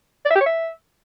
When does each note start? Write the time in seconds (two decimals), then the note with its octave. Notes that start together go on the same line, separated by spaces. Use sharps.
0.25 D5
0.30 E5
0.35 G4
0.40 C#5
0.46 E5